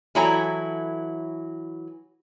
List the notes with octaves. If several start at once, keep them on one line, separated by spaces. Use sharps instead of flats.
E3 F#3 E4 A4 A#5